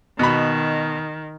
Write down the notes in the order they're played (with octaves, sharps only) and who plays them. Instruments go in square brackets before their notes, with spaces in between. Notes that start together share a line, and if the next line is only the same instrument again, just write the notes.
[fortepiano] B2 B5 [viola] D#3